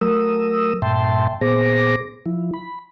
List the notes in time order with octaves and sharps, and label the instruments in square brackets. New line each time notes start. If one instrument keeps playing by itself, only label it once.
[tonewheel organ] F#3 A3 A#4 D#6 E6
G2 A#2 E5 G5 A5 C6
A#2 B3 G#4 C5 D6 A#6
F3 E4
B5